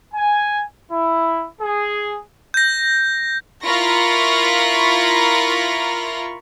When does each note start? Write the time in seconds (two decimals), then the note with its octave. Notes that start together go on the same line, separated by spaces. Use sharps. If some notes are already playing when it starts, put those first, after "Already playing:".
0.14 G#5
0.91 E4
1.61 G#4
2.54 G6 A#6
3.64 E4 F4 A#4 B5 C#6 A#6